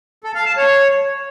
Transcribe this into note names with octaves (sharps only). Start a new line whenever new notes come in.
A4
F5
A5
C#5